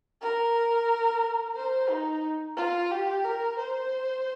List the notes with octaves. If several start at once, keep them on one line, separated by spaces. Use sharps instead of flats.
A#4
C5
D#4
F4
G4
A#4
C5